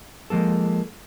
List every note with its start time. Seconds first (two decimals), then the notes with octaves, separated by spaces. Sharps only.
0.30 F3 G#3 A#3 A4